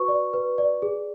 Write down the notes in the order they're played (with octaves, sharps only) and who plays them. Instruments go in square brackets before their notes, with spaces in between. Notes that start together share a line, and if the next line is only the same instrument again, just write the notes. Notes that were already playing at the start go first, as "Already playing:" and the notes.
Already playing: [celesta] F#4 B4 C#6
D5
B4
D5
G#4